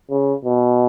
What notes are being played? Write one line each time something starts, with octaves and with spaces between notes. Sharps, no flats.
C#3
B2